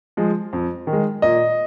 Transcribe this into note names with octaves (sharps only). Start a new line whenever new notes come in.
F3 G#3
F2
D#3
G#3
A#2 D#5